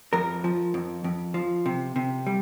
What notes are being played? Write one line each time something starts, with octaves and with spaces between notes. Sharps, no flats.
F2 A#4
F3
F2
F2
F3
C3
C3
G3